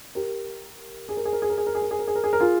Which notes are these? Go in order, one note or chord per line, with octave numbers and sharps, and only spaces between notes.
G4 A#4
G#4
A#4
G#4
A#4
G#4
A#4
G#4
A#4
G#4
A#4
G#4
A#4
G#4
A#4
G#4
A#4
F4 G#4